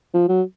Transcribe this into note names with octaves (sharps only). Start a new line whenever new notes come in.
F3
F#3